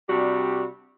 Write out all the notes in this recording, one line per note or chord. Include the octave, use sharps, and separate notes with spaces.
C3 G3 D4 F#4 G4